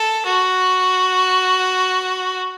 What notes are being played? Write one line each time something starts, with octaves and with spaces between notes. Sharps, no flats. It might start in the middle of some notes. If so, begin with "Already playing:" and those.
Already playing: A4
F#4